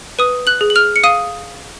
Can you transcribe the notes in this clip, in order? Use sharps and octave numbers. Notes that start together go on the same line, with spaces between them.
B4 D#6 D#7
F#6 F#7
G#4
F#7
F6 F7
C#7
F5 D#6 D#7